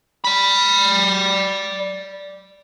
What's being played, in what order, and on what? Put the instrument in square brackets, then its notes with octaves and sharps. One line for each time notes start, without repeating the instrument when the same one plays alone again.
[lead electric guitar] D5 B5